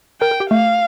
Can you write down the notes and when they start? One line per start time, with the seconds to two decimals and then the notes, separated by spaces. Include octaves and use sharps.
0.21 A#4 G5
0.31 A#4
0.40 G4
0.51 A3 F5